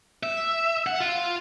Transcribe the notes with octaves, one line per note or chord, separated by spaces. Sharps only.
E5
F#5
F4